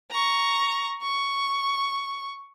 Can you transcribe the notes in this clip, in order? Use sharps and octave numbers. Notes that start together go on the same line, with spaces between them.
A#5 C#6
C#6